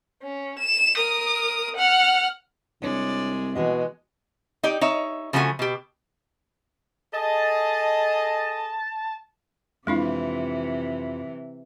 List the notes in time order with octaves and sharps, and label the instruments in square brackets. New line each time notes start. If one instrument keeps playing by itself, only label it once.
[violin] C#4
E7
A#4 D#6
F#5 F6
[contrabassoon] C2 [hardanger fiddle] G#3 D5 [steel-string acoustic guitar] D4 C#5
[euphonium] B2 [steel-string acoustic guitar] E3 F#4 D#5 [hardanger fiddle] G#3
[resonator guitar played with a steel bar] D#4 G4 D5
D#4 C#5 E5
C#3 F3 A3 F#4 G#4 G#5
B2 G4
[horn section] G#4 A4 D#5 [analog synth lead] A5
[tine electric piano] F2 F4 B5 [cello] C3 E3 [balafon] G#3 D4 E4